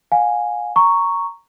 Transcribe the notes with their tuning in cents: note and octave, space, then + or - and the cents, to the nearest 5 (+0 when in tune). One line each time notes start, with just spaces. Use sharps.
F5 +35 G#5 -5
A#5 -10 C#6 +0